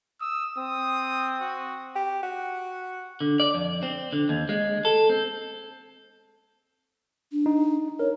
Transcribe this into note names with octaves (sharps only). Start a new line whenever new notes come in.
D#6 E6
C4 D#6
F#4
G4
F#4
D3
D5
F2
C4
D3
D#2
G#3
A4
C4
D4
D#4
A#4 C#5